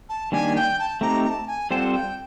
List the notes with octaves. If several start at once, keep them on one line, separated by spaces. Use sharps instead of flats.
A5
D#3 G3 A#3 D4 G4 G#5
G5
A5
A3 C4 D#4 G4 A#5
A#5
A5
G#5
G3 C4 F4 A4 C5 F#5 G5
G5